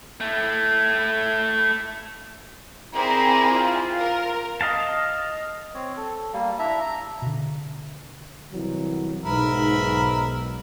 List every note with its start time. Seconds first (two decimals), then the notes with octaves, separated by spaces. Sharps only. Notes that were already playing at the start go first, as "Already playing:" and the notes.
0.20 A3 E4
2.94 C4 E4 G#4 A#4 D5 A#5
3.51 F4
4.00 A#4
4.61 D#5 F5 A5
5.74 C4 C#5
5.96 A4
6.33 G3 A#3
6.59 D4 E4 E5 A#5
6.81 A#5
7.22 B2 D3
8.52 C2 E3 F#3
9.25 B1 G#2 A#4 B4 E5